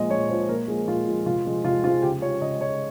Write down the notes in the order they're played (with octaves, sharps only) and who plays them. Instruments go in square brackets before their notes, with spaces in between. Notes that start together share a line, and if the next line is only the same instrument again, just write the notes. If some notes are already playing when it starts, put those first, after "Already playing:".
Already playing: [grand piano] A#2 F3 G#3 D#5
A#2 C#5
F3 G#3 C5
A#2 A#4
F3 G#3 G#4
A#2 F4
F3 G#3
C3 F4
F3 G#3
C3 F4
F3 F4
G#3
C#3 G4
G#3 C#5
C#3 D#5
G#3 C#5